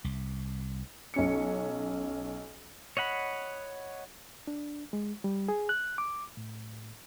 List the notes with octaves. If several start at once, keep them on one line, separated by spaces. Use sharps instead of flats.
C2
B1 C#4 C#7
C#5 D#5 F#5 B5
D4
G#3
G3
G#4
F#6
D6
A2